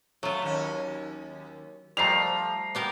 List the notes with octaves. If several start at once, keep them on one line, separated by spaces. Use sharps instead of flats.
F#3 A3 F4
D#2 C#4
F3 G3 A3 A#5 C7 F7
B3 G4 A#4